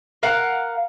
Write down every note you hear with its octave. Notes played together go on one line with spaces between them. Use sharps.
A#4 F5 F#5